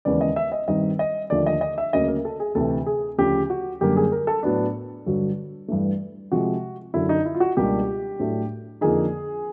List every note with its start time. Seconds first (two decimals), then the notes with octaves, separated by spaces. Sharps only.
0.05 D#2 C#3 E3 G#3 B3 D5
0.21 D#5
0.36 E5
0.52 D#5
0.68 G2 D#3 G3 C4 D#4 D#5
0.99 D#5
1.30 D#2 D3 F3 A3 D4 D5
1.46 D#5
1.61 D#5
1.78 E5
1.93 D2 C#3 F#3 A#3 C#4 D#5
2.08 A#4
2.25 A4
2.40 G#4
2.55 D2 C3 E3 A4
2.86 G#4
3.18 D2 C#3 F3 G4
3.50 F#4
3.81 F#2 D3 G3 A#3 G4
3.97 G#4
4.12 A#4
4.27 A4
4.43 A2 F#3 B3 D4
5.06 G2 D3 F#3
5.68 G2 E3 A3
6.32 C3 F3 G#3 F#4
6.94 F#2 D3 F#3 E4
7.09 D#4
7.25 E4
7.35 F4
7.40 F#4
7.57 C#2 B2 G3 A#3 D4 G4
8.19 A2 F#3 A3 D4
8.81 F2 D3 F3 A#3 D#4 G#4